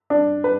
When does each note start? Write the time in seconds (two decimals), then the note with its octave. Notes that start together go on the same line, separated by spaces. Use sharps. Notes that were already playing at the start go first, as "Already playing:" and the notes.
0.10 D4
0.44 B4